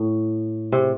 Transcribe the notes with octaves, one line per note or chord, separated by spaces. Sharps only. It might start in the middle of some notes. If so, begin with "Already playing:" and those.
Already playing: A2
C3